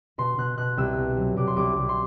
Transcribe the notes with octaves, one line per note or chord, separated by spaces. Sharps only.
B2 C6
B2 F#6
B2 F#6
C2 E6
B2
F#3
C2 D6
C6
C2 D6
C2
C6